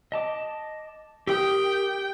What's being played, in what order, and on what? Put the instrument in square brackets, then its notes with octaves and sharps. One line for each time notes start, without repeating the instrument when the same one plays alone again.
[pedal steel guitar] D#5 A5 D6
[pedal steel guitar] G4 A#4 D#6 [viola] G5